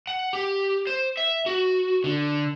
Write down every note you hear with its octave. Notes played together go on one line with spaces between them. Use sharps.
F#5
G4
C5
E5
F#4
D3